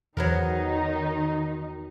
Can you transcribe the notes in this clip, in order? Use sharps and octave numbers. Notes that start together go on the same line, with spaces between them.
E2 D#3 F#3 B3 D#4 A#4